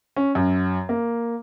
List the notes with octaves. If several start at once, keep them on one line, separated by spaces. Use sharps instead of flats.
C#4
F#2
A#3